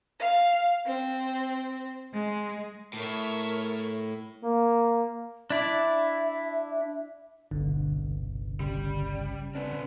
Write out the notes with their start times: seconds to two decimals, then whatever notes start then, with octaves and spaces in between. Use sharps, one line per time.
0.19 F5
0.87 C4
2.12 G#3
2.94 A2 A#4 C#5 E5
4.43 A#3
5.50 D4 E4 D5 E5
7.51 G1 C2 B2 D3
8.60 C#3 G3
9.55 B3 C4 D4